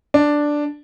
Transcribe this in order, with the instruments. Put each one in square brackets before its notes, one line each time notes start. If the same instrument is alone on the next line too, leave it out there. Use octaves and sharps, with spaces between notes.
[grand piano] D4